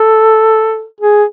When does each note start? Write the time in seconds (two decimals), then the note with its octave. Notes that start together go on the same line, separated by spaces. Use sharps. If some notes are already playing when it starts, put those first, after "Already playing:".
Already playing: A4
1.01 G#4